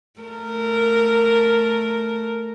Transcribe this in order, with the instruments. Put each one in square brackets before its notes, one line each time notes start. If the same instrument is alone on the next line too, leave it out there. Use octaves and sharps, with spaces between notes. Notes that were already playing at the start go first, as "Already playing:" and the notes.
[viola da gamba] A3 A#4